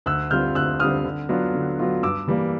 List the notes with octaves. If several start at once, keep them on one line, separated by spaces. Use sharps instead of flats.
D2 E6 F#6
D3 G3 C4 F4 F6 G6
D2 E6 F#6
D3 G3 C4 F4 D#6 F6
D3
F#3 B3 D4 F4
D3
F#3 B3 D4 F4
G2 D6 E6
E3 G3 A#3